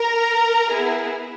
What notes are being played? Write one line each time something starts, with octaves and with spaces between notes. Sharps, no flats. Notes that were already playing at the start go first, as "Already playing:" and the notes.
Already playing: A#4 A#5
B3 E4 G#4